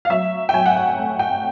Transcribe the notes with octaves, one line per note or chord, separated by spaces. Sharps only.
F5
F#3 E5
G5
F#3 G#5
F#5
G5
A3
G5